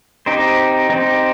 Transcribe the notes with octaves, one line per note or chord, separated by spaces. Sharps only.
C4 D#4 G4 C5
C4 D#4 G4 C5